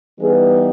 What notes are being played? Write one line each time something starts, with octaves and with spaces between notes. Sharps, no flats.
E3 G3 B3 D#4 G#4